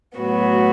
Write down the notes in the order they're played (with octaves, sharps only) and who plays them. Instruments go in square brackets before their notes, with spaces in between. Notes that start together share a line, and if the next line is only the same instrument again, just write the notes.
[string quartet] A2 F#3 B3 F#4